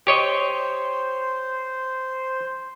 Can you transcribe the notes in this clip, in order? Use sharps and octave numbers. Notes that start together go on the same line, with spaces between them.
G4 C5 C#5 D#5